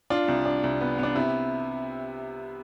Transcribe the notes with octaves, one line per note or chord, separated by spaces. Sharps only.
D4 F4
C2
D4
C2
B3
B3 D4
C3 E4